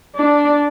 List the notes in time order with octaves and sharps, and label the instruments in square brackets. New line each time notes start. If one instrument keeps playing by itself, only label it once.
[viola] D4